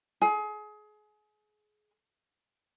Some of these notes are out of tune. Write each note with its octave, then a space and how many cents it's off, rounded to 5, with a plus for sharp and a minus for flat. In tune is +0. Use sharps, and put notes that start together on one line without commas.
G#4 +30